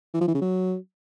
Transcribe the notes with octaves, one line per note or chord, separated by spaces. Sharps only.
E3
F3
E3
C#3
F#3